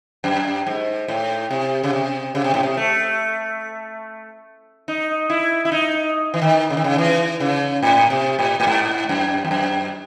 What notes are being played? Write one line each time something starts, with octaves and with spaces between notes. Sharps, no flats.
F#2
G#2
A2
C3
C#3
C3
C#3
C3
A2
C3
A3
D#4
E4
E4
D#4
E3
D#3
C#3
D#3
C#3
E3
C#3
A2
C3
A2
A2
G#2
F#2
E2
F#2